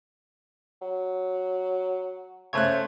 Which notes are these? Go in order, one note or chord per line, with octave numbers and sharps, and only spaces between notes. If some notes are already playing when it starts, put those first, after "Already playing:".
F#3
C#3 A3 C5 C#5 F#6 G#6